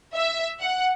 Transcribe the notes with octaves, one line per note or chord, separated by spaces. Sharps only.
E5
F#5